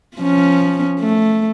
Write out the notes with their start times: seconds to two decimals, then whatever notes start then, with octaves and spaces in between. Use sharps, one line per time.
0.17 F3 C#4
1.00 A3